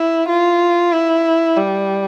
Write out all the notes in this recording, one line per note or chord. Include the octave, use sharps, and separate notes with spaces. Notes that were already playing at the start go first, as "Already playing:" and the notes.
Already playing: E4
F4
E4
G3